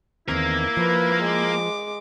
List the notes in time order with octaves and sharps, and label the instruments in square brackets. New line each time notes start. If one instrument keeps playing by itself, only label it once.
[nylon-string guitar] E2 D#3 C4 [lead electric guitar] A#3 A#4 [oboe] E4
[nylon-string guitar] F3 [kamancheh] B4
[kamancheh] G#3 D6